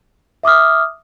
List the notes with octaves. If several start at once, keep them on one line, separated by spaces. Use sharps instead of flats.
E5 D6 D#6 F6